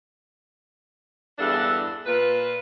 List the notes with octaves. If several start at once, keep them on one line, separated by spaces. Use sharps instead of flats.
E2 G2 D4 A4 E5
A#2 F4 B4